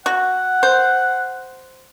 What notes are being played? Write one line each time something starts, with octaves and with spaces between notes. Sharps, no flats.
F#4 F#5
C5